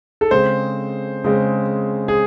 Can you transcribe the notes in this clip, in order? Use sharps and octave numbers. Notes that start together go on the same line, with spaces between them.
A4
C#3 G#3 C4 C5
C#3 G#3 C4
G#4